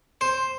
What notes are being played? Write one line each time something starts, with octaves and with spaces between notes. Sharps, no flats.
C5